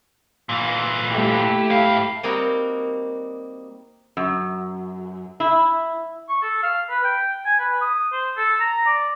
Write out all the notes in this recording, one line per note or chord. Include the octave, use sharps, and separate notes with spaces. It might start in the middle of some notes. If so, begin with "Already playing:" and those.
A#2 E3
A3 E4 G4
G#2 F5
G3 A#3 C4 D#4 F#4
F#2
E4
C#6
A4
F5
B4
G5
G#5
B4
D#6
C5
A4
A#5
D5